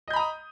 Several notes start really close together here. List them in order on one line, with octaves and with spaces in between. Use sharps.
D#5 G6 B5 A#5 D#6